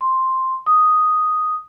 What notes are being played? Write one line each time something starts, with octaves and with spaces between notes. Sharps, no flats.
C6
D#6